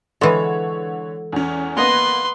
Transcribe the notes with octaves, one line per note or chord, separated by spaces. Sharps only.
D3 E3 G#3 A4 C#5
E2 C#4
A#3 B3 B4 D#5 F#5 A#5 C6